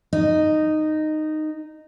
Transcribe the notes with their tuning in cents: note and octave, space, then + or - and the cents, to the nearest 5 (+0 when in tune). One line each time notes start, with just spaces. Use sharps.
D#4 -10